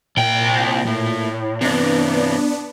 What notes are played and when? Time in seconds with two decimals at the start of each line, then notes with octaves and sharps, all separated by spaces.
0.17 C2 A#2 G5
0.87 A2
1.61 G2 C3 B3 D4